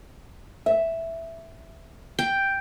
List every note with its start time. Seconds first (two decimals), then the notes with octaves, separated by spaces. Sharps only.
0.66 E5
2.19 G5